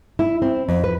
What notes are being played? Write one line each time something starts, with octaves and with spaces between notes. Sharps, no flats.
E4
C4
F2
B4